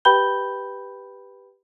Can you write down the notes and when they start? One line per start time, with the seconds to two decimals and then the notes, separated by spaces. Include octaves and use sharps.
0.05 G4 B4 G5 B5 G6 G7